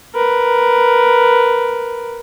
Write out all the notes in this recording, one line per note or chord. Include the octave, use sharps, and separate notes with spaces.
A#4 B4